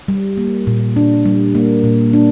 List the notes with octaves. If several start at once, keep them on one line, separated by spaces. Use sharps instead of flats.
G3
A#3
A#2
D4
G3
A#3
A#2
D4